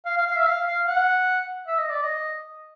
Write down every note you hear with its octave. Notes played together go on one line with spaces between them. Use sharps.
F5
F5
F5
E5
F5
F5
F#5
E5
D#5
D5
D#5